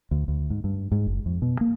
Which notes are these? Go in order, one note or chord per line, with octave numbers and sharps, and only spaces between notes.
D2
D2
G#2
G2
G#2
F#1
F2
B2
A#3